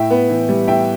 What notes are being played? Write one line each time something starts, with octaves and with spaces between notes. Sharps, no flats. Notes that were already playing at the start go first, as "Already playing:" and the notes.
Already playing: A2 E5 G5
B3
E3
G3
A2 E5 G5